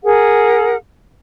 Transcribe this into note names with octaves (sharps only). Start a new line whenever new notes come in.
G#4 A#4 F#5